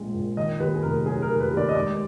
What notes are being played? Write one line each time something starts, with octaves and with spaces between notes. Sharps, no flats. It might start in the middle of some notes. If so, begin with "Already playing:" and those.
Already playing: A#1 A#2 G#3
A#2
D#3 D#5
D#2 B4
G#4
F1 A#4
F#3 G#4
A#4
D#3
B4
D#2
D5
D#5
G#3 D5